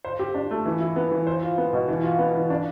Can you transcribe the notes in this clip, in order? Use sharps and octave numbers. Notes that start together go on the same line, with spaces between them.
C5
G4
D4
A3
E3
E4
B3
E3
C5
F4
B3
B2
E3
F4
B3
E3
D4